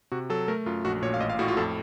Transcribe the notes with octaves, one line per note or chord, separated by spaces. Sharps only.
C3 F#4
F#3 A4
A3 A#4
F#2 F4
A#1 F#4
A#2 C#5
F5
A1 D#5
F5
A2 F#4
F4
F#4
F2 A4